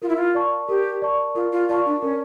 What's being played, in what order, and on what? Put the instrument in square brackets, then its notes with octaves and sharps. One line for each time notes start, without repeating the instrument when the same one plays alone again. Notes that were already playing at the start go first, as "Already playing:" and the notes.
[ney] F4 [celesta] A#4
[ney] E4
F4
[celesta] D5 A5 C#6
[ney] G4 [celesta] A#4
[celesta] D5 A5 C#6
[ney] F4 [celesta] A#4
[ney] F4
[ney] F4 [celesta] D5 A5 C#6
[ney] D4
[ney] C#4 [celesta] A#4